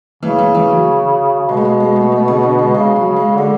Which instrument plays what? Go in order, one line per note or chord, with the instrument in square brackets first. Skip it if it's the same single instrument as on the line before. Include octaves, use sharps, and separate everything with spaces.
[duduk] C#3 [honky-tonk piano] E3
[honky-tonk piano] E3
E3
F#3
[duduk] C#3
[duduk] B2 [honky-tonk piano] G#3
[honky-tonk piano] A3
G#3
G#3
A3
A3
C#3
D3
G#3
[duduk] C#3 [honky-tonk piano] G#3
[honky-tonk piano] F#3
[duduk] C#3
[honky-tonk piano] G#3
[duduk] D3 [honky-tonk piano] G#3